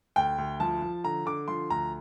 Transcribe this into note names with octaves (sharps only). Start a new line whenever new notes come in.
D2 G5
D2
F3 A5
F3
D3 A#5
D3 D6
F3 C6
D2 A#5